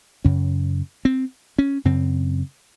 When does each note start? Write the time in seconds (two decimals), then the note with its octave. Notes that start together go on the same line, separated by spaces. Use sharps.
0.25 F#2 C#3 C#4
1.05 C4
1.58 C#4
1.85 F#2 C#3 C4